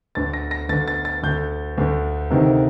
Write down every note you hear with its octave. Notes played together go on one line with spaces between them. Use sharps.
D2 D3 A6
A#6
A#6
D2 D3 A6
A6
A6
D2 D3 G6
D2 D3
D2 C3 D#3